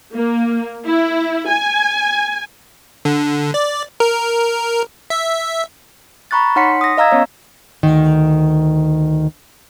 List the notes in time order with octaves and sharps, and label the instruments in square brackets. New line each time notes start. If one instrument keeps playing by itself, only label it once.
[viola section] A#3
E4
G#5
[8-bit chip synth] D3
D5
A#4
E5
[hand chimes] A#5 B5 C#6 F#6 A6
D#4 C#5 F#5 C6 B6 C#7
D#6 A#6
D#5 F5 A#5 E6 G#6
B3 C#4 C#5 D#5
[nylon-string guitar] D2 D#3